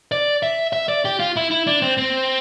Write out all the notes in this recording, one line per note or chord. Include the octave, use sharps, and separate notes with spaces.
D5
E5
E5
D5
G4
F4
E4
E4
D4
C4
C4